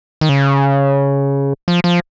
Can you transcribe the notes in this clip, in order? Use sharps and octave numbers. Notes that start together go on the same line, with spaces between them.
D#3
C#3
F3
F3